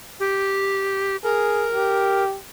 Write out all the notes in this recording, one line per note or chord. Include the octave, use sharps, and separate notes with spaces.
G4
G#4 A#4
G4